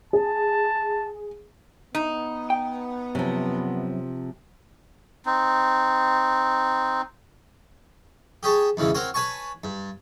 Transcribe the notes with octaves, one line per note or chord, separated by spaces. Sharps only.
G#4 A5
B3 D#4
G5
F#2 C3 F3
C4 D#4
G4 G#4 C#5 A5
E2 G#2 C#3 E3
C4 F#4 A#4 C#5
B4 C#5 G#5 A5 C#6
G2